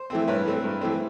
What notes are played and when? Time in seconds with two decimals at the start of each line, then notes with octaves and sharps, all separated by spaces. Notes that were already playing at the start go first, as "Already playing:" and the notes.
Already playing: C5
0.10 E3 A3 C4
0.27 G2 B4 C#5
0.45 E3 A3 C4
0.64 G2
0.81 E3 A3 C4